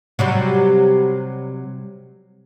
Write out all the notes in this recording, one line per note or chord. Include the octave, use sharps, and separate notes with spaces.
C3 F#3 G3